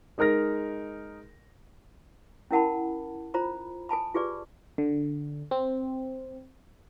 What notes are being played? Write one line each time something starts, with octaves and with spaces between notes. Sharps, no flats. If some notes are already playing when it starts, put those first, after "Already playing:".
G#3 D#4 A#4 F6 A#6
C#4 E4 A#4 F#5 A5 B5
F4 C5 A#5 B5
A4 G#5 A5 B5
F4 G4 G#4 B4 D5
D3
C4